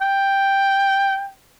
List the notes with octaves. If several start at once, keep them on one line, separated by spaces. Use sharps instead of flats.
G5